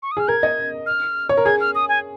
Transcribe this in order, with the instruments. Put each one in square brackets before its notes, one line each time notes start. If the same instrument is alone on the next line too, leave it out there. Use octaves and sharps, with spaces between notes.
[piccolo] C#6
D#6
[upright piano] G#4 [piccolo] F6
[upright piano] A#4 [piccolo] G#6
[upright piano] D#5
[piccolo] F6
[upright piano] C#5
A#4
[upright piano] G#4 [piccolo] G#6
[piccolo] F6
D#6
G#5